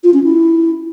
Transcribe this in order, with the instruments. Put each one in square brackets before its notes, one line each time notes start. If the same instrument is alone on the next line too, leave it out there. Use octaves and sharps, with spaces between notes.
[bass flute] F4
C#4
E4